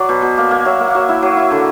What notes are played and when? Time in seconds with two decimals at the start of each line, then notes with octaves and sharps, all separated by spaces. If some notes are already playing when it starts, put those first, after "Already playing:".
Already playing: F#3 D5
0.09 B2
0.22 B2
0.38 A#3
0.51 A#3
0.65 F#3 E5
0.80 A#3
0.88 F#5
0.95 F#3
1.09 E4
1.22 F#3
1.37 E4
1.51 D3